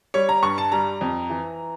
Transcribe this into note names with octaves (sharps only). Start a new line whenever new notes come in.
G3 C#5
A#5
G2 C#6
A5
G3 A#5
F2
E3